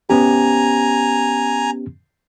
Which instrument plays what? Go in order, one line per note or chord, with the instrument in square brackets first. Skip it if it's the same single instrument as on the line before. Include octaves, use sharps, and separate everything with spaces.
[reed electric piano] B3 C#4 G4 [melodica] G#5 A#5